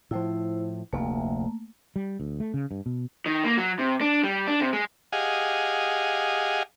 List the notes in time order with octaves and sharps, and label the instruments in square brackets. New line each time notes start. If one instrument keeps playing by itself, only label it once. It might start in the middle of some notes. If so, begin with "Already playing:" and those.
[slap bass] A2 F3 [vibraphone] E4 C5
[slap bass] F1 D2 [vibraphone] A3 A#3
[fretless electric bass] G3
D2
A3
C#3
G2
B2
[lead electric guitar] D#3
A#3
F#3
C3
D4
G3
D4
C3
G#3
[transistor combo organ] G4 G#4 D#5 F5 F#5 G#5